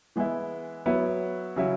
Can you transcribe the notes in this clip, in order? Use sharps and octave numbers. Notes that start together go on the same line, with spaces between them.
E3 G#3 B3 E4
F#3 B3 E4
C#3 F#3 E4